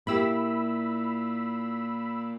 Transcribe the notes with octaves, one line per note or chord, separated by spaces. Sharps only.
A#2 A#3 E4 G4 B5 E6